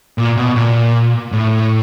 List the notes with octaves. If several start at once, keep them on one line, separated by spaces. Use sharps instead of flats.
A#2
B2
A#2
A2